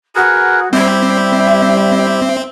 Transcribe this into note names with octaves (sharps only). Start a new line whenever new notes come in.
F#4 G#4 A#4 B4
G3 C4 E4 G4 E5